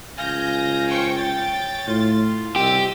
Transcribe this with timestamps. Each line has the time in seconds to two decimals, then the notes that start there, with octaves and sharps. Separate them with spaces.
0.18 C#2 F5 G#5 G6 A#6
0.88 C5 G5 C#6
1.17 C#5 G5 A6
1.87 A2 F4
2.56 C2 G4 D#5 E6